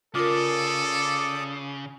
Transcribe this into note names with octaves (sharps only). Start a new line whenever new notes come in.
C#3 F4 A4 A#4 D5 D6 D#6